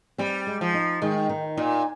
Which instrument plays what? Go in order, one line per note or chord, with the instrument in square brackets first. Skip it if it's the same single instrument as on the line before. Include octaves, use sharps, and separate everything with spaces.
[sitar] G3 [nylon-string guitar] C4
[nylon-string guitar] G#3
[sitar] F3
[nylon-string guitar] D#4
[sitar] D#3 [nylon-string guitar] G#3
[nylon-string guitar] D#3
[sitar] A#2 [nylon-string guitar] D#4